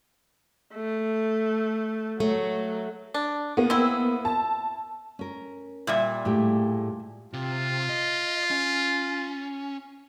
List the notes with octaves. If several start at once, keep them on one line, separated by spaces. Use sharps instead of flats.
A3
F#3 A3
D4
A#3 B3
C4 E4
A5
C#4 A#4
A#2 G3 E5
A2 G#3 G4
C3 F4
D#5
C#4